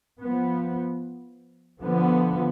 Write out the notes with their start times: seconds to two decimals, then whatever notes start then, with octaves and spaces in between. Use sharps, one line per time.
0.21 F3 B3
1.80 D3 F3 B3